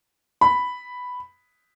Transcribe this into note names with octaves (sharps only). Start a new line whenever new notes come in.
B5